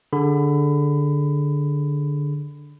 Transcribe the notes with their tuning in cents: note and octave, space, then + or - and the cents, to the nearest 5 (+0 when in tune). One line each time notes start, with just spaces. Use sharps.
D3 +0 G#4 +0 B5 +25